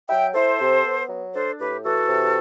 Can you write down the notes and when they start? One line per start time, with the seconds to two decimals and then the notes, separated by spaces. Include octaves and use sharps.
0.10 F#3 E5 G5
0.34 E4 A4 C5
0.60 C3
0.84 B3
1.09 F#3
1.34 D4 A4 C5
1.59 A2 G4 B4
1.84 E3 F#4 A4
2.09 C3